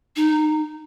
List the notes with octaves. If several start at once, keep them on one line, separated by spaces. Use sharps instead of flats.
D#4